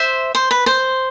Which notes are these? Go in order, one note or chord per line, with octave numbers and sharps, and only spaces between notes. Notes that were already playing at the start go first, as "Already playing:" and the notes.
Already playing: C5 E5
C5
B4
C5